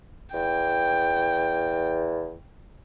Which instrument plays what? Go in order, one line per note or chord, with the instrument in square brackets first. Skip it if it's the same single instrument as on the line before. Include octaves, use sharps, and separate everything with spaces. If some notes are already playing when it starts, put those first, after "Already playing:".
[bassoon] E2 [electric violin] G5